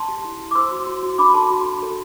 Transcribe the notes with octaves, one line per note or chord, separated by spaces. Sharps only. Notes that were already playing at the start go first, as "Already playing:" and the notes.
Already playing: A5 C6
G4
E4
E4
D6
C5 C6 E6
F#4
F#4
F#4
D4 B5 D6
B5
A4 A5 C6
F#4
D4
A4